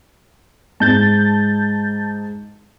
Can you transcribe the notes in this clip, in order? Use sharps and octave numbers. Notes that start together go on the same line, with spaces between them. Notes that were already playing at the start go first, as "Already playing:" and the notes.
G#2 A5 G6 A6